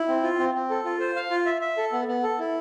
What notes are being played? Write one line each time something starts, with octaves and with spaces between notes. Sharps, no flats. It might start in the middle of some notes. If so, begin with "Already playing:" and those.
Already playing: E4
C4
F4
C4
C4
A4
F4
C5
F5
F4
E5
E5
A4
B3
B3
A4
E4